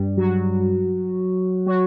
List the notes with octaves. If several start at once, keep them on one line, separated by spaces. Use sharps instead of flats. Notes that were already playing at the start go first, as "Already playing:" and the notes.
Already playing: G2 G3
F#3 F#4
F#3 F#4